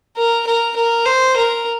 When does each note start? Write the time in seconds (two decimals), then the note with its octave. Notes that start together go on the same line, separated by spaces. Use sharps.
0.17 A#4
0.47 A#4
0.76 A#4
1.06 C5
1.36 A#4